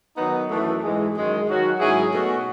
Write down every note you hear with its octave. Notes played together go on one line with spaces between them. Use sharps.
D#3 F#3 B3 D#4
F#2 E3 A3
G#2 E3 G#3
F#2 D#3 G#3
D#3 F#3 C#4 F#4
G#2 F#3 C#4 E4 G#4
B2 A3 C#4 F#4